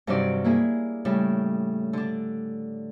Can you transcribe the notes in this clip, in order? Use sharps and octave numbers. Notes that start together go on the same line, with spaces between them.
G2 C3 D#3 F#3 D5 D6
A#3 E4 G#4
A2 C#3 G3
D3 D4